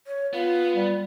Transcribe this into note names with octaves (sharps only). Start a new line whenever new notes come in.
C#5
B3 F4 F5
G3